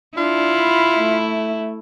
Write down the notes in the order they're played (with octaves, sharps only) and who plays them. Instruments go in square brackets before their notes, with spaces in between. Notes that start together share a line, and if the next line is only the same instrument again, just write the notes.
[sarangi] D4 [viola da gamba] E4 [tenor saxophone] F4
[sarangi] B5
A3